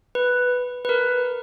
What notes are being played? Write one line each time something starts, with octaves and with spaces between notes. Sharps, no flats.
B4
B4
A#4